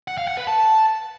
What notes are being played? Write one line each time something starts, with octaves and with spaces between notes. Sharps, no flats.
F#5
F5
F#5
B4
A5